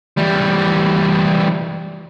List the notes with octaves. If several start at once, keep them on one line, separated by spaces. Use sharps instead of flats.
E3 G3